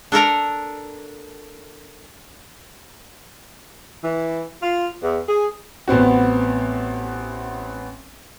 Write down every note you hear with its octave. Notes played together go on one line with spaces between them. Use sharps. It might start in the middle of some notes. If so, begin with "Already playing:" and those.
D4 A4 A#4 A#5
E3
F4
E2
G#4
A1 B3 C4 F#4